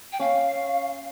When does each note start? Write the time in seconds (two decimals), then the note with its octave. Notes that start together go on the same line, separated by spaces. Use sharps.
0.12 G5
0.20 C#4 F5